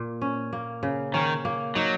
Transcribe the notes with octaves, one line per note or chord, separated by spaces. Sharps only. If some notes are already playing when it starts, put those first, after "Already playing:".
Already playing: A#2 A#3
C#4
A#3
C#3
D#3 C#4
A#3
F#3 D#4